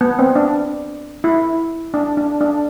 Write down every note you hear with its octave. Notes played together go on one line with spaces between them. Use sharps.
B3
C4
D4
E4
D4
D4
D4